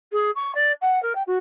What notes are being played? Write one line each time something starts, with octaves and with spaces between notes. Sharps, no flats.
G#4
C#6
D5
F#5
A#4
G5
F#4